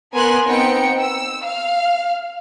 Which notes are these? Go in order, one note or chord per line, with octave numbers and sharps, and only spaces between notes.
B3 A#4 G#5 C6 F#6
B3 C4 D#4 G5 C#7
E6
F5